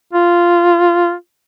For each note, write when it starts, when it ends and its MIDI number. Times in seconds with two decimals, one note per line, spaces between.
0.13 1.13 65